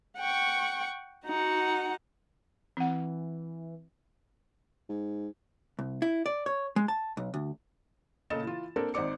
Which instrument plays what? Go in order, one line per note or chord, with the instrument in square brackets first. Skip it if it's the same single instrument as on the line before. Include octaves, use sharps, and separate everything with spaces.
[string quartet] F#5 G5 C#6
D#4 F#4 F#5
[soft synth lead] E3 [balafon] C4 F#5
[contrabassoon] G#2
[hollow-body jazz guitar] C2
E4
D5
C#5
G#3
A5
B1
D2
[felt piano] A#2 C#3 A4 D#5 A6 E7
E3 F4
A#3 C4 D4 A4 A#4
G#1 D#4 C5 D5 D6 C#7